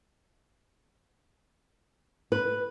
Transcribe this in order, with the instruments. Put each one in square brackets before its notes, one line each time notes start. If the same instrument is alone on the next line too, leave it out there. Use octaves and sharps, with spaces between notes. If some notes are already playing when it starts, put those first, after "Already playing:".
[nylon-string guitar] B4